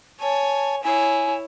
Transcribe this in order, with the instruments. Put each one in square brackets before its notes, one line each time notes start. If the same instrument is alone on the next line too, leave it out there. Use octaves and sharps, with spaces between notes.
[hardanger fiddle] C#5 G#5 [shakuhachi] A5
[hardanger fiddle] E4 C#5 [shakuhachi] G#5